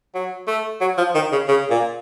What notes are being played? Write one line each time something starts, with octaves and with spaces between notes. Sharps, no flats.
F#3
A3
F#3
F3
D#3
C#3
C#3
A#2